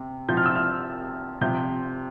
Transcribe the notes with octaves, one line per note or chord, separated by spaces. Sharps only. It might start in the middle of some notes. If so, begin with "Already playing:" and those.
Already playing: C3
C3 F3 G6
F6
E6
F6
C3 F3 G6